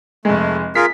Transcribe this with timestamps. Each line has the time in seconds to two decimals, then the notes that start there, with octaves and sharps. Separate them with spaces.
0.25 F1 G#3 A3
0.75 F4 G#4 A#4 B6